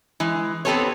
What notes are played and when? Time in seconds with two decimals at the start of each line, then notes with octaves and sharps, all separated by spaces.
0.20 E3 G#3
0.65 B3 C4 G4 A4 B4 C#5